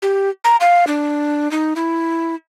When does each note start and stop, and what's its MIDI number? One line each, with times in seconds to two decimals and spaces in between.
0.02 0.30 67
0.44 0.56 82
0.61 0.85 77
0.87 1.51 62
1.51 1.74 63
1.76 2.35 64